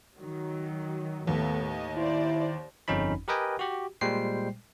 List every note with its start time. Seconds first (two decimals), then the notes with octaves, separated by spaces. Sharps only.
0.18 D#3 F#3
1.27 D#2 A2 B3 A4
1.66 D#5
1.97 E4 C5 D5
2.88 G1 F2 C#4 D#4 B5
3.28 G4 A#4 B4 D#5 G5 G#5
3.59 F#4 G4
4.01 A#2 G3 G#3 C5 G5 C7